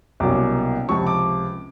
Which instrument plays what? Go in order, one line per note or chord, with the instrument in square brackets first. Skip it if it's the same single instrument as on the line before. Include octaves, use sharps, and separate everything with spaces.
[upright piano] C2 B2 F#3 A#3 C#4 D6
C#2 C3 F3 C#6
D6